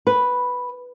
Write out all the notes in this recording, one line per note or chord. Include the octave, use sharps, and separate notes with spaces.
B4